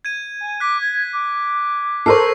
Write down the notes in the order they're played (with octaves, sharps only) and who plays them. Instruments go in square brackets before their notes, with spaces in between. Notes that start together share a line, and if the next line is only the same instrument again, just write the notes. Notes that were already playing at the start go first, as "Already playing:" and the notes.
[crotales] G#6 D#7
[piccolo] G#5
[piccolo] D6 [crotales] F#6 B6
[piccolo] G#6
D6
[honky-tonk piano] A4 A#4 C5 [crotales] C#6 E6 C7